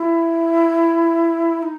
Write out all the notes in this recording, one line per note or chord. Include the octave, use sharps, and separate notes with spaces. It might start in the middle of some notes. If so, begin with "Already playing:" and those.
Already playing: E4
D#4